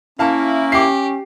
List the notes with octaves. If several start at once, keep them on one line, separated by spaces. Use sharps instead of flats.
A#3 C#4 E4 F5 A5
G4 D6 C7